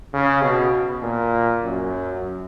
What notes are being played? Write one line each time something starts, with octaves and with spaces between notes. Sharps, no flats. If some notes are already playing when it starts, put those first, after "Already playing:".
C#3
B2
A#2
F#2